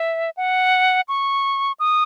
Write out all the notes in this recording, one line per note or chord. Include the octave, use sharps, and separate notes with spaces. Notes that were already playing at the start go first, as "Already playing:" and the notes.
Already playing: E5
F#5
C#6
D#6